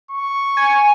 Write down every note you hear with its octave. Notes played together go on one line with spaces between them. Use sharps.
C#6
G#5